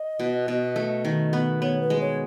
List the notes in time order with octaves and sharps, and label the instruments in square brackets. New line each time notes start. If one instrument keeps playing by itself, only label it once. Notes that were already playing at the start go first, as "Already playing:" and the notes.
Already playing: [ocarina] D#5
[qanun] B2
B2
A3
D#3
B3
[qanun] B3 [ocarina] C#5
[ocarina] B4
[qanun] G#3
[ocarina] C#5